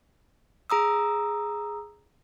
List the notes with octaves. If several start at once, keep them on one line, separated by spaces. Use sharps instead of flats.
G#4 A#5 D#6 E6